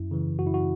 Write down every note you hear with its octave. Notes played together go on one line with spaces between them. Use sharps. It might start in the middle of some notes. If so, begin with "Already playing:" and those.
Already playing: F#2 E4
C#3 E3
F#2 F#4
E4
F#4